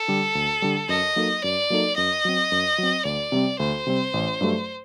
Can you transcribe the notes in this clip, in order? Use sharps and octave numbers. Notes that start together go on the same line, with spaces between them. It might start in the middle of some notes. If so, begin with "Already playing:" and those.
Already playing: A4
D3 G3
D2
D3 G3
F#2 D#5
F#3 A#3 D#4 A4
F#2 D5
F#3 A#3 D#4 A4
F#2 D#5
F#3 C4
F#2
F#3 C4
D2 D5
C3 G3 C4
D2 C5
C3 G3 C4
A1
G2 F#3 A3